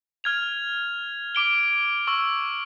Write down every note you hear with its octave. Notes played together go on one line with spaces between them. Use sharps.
F6 G#6 F7
D6 D7 G7
C#6 E6